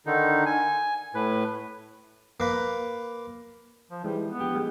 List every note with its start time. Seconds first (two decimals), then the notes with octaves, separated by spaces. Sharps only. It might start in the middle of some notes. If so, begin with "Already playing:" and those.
0.06 D3 D#3 D#4
0.46 G#5
1.15 A2 B4
2.40 A#3 B4
3.91 F3
4.04 E3 G3 G#3
4.27 B3
4.40 A#1 G4
4.55 G#3